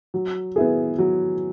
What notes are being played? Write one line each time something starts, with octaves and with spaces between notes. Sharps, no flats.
F#3
B3 E4 G#4
F#3